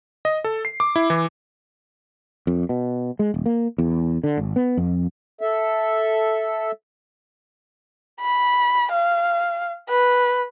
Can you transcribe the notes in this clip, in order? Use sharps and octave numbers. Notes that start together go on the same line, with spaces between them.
D#5
A4
C7
D6
E4
E3
F2
B2
G#3
D#1
A#3
E2
D3
G#1
B3
F2
A4 E5
B5
F5
B4